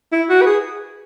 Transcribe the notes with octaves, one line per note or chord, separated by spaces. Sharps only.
E4
F#4
B4
G#4